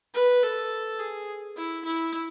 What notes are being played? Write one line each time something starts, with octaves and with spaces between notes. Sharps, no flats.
B4
A4
G#4
E4
E4